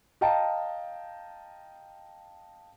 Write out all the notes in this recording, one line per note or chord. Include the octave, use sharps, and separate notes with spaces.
D#5 F5 G5 A5 A#5